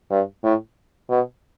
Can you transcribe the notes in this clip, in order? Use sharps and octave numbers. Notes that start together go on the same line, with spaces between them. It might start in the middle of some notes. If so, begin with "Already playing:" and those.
G2
A2
B2